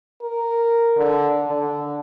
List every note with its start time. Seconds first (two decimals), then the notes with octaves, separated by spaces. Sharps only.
0.22 A#4
0.97 D3
1.48 D3